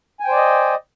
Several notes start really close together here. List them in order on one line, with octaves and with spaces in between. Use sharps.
G#5 G5 C5 D5 D#5